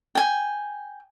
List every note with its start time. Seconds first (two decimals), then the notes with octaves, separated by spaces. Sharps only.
0.15 G5 G#5